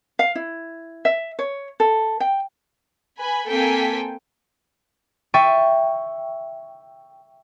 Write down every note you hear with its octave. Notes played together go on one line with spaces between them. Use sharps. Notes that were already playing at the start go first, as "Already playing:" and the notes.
F5
E4
E5
C#5
A4
G5
B4 G#5 B5
A#3 C4 A4 G5 G#5 B6
E5 G5 C#6 A6 D#7